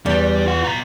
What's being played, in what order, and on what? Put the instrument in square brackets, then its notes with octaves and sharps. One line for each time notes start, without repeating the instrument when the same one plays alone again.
[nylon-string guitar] E2 [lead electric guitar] G3 D5
[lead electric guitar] F4 F#5
B2 A#5